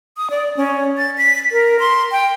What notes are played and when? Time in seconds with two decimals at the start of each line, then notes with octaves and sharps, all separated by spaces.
0.17 D#6
0.30 D5
0.57 C#4
0.98 A6
1.18 B6
1.52 A#4
1.79 C6
2.12 G5